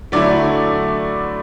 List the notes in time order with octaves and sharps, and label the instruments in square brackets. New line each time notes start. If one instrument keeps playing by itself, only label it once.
[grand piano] D3 F#3 A3 E4 D5